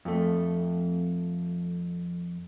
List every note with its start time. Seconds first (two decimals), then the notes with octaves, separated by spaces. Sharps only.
0.05 F2 A3